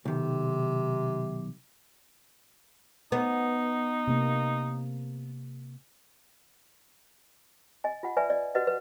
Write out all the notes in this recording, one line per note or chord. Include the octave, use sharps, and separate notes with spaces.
B1 C3 D#3
B3 D#4
C3 A#3
D#5 G#5
F4 F#5
B4 D5 E5 G#5
D5 D#5
F#4 B4 D#5 F#5
B4 F#5